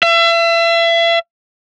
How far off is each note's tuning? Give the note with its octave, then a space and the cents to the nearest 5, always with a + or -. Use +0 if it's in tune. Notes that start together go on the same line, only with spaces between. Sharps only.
E5 +35